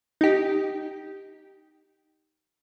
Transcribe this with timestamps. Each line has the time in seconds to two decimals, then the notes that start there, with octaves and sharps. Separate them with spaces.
0.21 D#4 G4